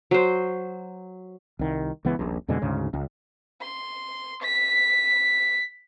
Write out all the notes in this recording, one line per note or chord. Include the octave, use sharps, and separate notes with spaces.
F#3 C5
C2 D#3
C#2 E3 B3
D#1 A#1
F2 B2 D3 G#3
D2 G#2 C#3
C#2
C6
B6